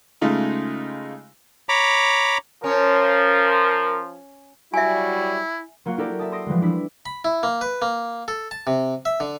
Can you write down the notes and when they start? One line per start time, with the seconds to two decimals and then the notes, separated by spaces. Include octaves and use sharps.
0.21 C#3 G#3 A3 D#4 F4
1.69 C#5 A#5 B5 D6
2.64 F3 C#4 A#4
4.74 F#3 G3 E4 F#4 E5 G#5
5.85 F#3 A#3 F4 F#4
5.98 E4 F#4 G4 A4 A#4 D5
6.19 E5 A5 D#6
6.32 C6 D#6 A#6 D7
6.46 E3 F3 G3 G#3
6.61 D4 E4 B6
7.06 B5
7.25 E4
7.43 A#3
7.61 B4
7.82 A#3
8.28 A4
8.51 A5
8.67 C3
9.05 E5
9.20 D3